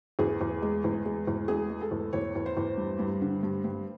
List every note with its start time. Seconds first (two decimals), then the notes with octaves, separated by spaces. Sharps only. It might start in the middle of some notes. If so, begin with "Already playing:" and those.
0.19 E2 G#4
0.41 E2
0.62 G#3
0.84 E2
1.06 G#3
1.27 E2
1.48 G#3 G#4
1.70 G#3
1.81 A4
1.91 E2
2.13 E2 C#5
2.35 E2
2.46 C5
2.57 E2
2.77 G2
2.99 G2
3.22 D3
3.43 G2
3.64 G2